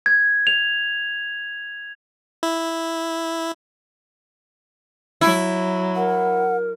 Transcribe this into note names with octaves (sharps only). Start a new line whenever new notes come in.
G#6
F7
E4
F#3 E4
A#4 F#5